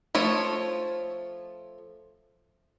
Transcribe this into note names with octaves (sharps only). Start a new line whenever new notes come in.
F3 A3 C#5